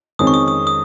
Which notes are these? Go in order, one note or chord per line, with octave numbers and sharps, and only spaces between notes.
F2 D#3 G#3 C#4 D#6
C#6
D#6
D#6
D#6